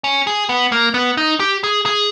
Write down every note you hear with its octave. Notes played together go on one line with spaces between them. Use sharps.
C#4
G#4
B3
A#3
B3
D#4
G4
G#4
G#4